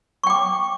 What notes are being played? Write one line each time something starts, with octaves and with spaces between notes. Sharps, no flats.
G5 C#6 D6